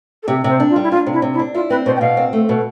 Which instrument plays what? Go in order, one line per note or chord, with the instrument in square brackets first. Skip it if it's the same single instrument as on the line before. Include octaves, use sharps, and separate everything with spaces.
[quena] A4
[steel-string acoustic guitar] C3 [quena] G4
[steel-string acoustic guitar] C3 [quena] C5
[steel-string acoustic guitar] D4
[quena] F4
[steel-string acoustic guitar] G3
[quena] E4
[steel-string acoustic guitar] D4 [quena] F4
[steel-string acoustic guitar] C3
[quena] E4
[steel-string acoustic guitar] C3
[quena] E4
[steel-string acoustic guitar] D4
[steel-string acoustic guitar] E4 [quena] F4
[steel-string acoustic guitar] C4 [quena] B4
[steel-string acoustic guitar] B2 [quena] C5
[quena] G5
[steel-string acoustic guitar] B2 [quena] F5
[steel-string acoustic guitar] C4
A3
B2